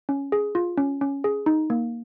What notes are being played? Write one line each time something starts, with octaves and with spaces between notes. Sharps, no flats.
C#4
G#4
F4
C#4
C#4
G#4
D#4
A#3